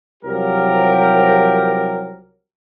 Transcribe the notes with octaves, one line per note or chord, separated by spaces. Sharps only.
C2 F3 F#3 G4 A#4